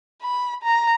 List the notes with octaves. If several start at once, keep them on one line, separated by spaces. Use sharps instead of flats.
B5
A#5